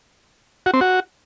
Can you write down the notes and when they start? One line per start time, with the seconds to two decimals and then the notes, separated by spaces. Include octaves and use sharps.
0.66 F#4
0.74 C4
0.81 F#4